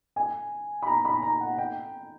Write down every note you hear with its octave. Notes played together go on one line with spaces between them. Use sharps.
G#5
B5
A#5
B5
A#5
F#5
G5